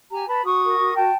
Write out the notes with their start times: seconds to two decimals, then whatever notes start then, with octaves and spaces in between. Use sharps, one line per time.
0.10 G4 G#5 A#5
0.27 B4 A5 B5
0.44 F#4 C#6 D#6
0.61 A#4
0.78 F#4
0.95 F#4 G5 A5